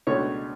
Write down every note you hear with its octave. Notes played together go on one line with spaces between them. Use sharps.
C#2 B2 A3 D4 C#5